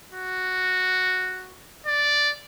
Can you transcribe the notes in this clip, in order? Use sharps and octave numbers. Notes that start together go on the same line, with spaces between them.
F#4
D5